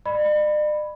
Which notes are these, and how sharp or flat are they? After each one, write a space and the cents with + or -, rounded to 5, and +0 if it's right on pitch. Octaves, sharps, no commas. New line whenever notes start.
D5 +45 B5 +0